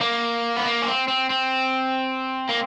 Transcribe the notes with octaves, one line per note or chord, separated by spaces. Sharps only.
A#3
B3
A#3
C#4
C4
C4
C4
A#3